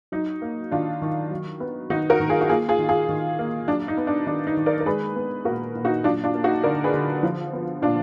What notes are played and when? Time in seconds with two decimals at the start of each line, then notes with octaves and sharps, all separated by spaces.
0.12 F#3 D#4
0.42 A#3
0.71 D#3 D4 F4
1.02 D#3
1.31 F#3
1.60 B3
1.90 D#3 D#4 F#4
2.10 F#4 A#4
2.20 D#3
2.30 F4 G#4
2.41 F#4
2.49 A#3 F4 G#4
2.68 F4 G#4
2.79 D#3
2.89 F4 G#4
3.09 D#3
3.39 A#3
3.68 F#3 D4
3.88 D#4
3.97 B3
4.07 D4
4.27 D#3 D4
4.47 D#4
4.57 D#3
4.66 A#4 D5
4.80 A#4
4.86 G#3 G#4 B4
5.16 B3
5.45 A#2 F#4 A#4
5.75 A#2
5.85 D#4 F#4
6.04 F#3 D4 F4
6.24 D4 F4
6.35 A#3
6.44 D#4 F#4
6.64 D3 A#4 D5
6.84 G#4 B4
6.94 D3
7.23 F3
7.53 B3
7.82 A#2 D4 F4